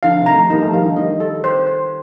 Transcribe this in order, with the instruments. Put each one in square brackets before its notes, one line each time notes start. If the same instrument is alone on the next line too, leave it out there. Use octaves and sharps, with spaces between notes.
[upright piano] D3 F3 [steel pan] F5
[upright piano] C3 D#3
[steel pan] A#5
[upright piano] F3 A3
[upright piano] G3 A#3 [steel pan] D#4
[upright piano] F3 A3
[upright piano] D#3 G3 [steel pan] F5
[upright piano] D3 F3
[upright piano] D#3 G3 [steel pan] D#5
[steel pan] A4
C5
C5